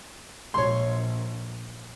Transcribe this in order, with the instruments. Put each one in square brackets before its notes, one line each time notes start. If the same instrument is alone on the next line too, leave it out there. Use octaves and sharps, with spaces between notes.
[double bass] A#1 [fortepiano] C#5 C6